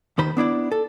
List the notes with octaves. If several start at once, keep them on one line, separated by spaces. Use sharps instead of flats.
D#2 D#3 C5 B5
B3 D4 E4 D5
A4